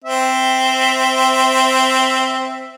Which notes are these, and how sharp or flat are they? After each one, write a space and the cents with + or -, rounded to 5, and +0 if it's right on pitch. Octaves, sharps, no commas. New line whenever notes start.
C4 -5 E5 +0